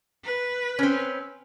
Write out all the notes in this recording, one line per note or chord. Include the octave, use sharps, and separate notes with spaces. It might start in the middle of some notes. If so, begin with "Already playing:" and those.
B4
C4 C#4